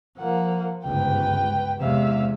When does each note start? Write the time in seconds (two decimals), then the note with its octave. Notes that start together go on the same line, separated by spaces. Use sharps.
0.18 F3 A#3 F#5
0.85 G1 C#2 G#2 B4 G5
1.81 E2 C3 G#3 E5 F5